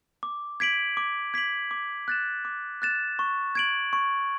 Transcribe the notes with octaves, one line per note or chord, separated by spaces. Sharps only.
D6
G#6 B6 D7 F#7
D6
G#6 B6 D7 F#7
D6
F#6 A6 E7
D6
F#6 A6 E7
C#6
G#6 D7 F#7
C#6